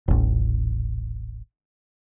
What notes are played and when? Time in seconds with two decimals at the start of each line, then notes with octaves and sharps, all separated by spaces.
0.08 D#1 A1